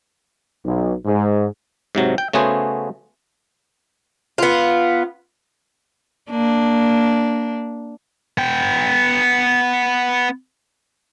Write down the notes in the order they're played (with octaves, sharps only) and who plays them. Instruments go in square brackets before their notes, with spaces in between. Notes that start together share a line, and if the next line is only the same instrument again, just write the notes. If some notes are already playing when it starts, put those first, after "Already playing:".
[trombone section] B1
G#2
[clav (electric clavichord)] G#2 C3 F#3
G5
C#3 A3 B3 F#4 G#4 C5
[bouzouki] B3 F4
[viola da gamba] A#3 D4
[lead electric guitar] B3 G5